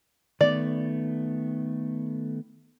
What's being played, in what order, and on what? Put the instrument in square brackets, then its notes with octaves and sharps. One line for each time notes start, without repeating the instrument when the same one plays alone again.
[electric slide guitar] D#3 A3 B3 [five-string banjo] D5